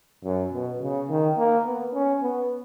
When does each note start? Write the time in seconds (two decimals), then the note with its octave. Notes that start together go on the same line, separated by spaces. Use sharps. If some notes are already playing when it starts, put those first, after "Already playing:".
0.24 F#2
0.52 B2
0.81 C#3
1.09 D#3
1.37 A#3
1.66 B3
1.94 C#4
2.22 B3